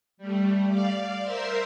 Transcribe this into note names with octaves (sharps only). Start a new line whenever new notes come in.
G3 A3
D5 F5
A#4 C5 E5 C6